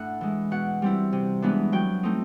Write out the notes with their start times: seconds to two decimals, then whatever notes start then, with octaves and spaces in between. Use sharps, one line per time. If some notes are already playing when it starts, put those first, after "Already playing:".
Already playing: A2 D4 F#5
0.21 E3 G#3
0.51 B2 F#5
0.82 G3 C4 E4
1.12 C3
1.42 E3 G#3 B3 D4
1.72 F#3 G5
2.03 A3 C4 D#4